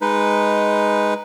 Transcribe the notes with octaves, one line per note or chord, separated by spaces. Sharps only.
G#3 D#4 B4